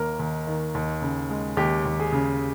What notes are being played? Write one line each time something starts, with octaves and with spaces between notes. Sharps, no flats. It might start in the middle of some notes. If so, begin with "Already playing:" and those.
Already playing: D#2 D#3 A#3 A#4
D#2
D#3
D#2
C#3
G#3
D#2 G4
D#2
G#4
C#3